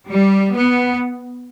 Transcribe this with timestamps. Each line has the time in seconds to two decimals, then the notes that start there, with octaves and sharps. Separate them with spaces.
0.09 G3
0.55 B3